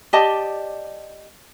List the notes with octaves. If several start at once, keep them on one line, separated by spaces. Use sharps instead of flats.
G4 D5 D#5 A5